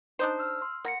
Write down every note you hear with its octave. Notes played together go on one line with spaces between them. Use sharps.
D4 D#4 C5
E6 F6
C6
A#3 F#5 A#6 C#7